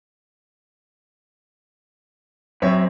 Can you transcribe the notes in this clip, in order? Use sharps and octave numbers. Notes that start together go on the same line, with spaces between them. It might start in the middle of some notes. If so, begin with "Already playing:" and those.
F#2 C4 C#5 E5